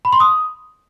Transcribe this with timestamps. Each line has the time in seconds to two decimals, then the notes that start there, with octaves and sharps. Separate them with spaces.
0.05 B5
0.13 C6
0.20 D#6